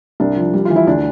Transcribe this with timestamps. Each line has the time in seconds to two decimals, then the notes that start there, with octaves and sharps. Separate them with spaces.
0.20 C2 D4
0.37 F3
0.54 G3
0.65 E3 F4
0.76 E4
0.87 D2 D4